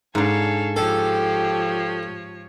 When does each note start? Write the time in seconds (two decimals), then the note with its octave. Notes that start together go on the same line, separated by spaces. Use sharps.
0.15 G#2 D4 A4 C#5 F5 G#5
0.76 F3 G4 A4 C#5